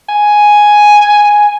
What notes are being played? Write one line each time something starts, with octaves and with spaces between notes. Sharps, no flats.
G#5